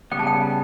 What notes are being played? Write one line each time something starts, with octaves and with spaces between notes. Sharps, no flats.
C#3 G3 B3 G5
A5
G5